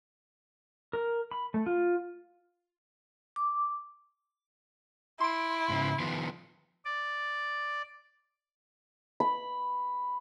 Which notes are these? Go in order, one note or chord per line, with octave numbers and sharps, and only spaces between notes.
A#4
B5
A3
F4
D6
E4 C6 D7
G#2 C#3
D#3 F3 B3
D5
B5